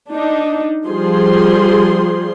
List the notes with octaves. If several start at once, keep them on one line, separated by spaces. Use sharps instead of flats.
D4 D#4
F3 G3 G#4 C6